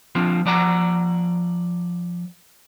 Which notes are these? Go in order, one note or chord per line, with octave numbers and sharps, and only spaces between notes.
F3 C4 D4 F4
F3 D5 F#5 A#5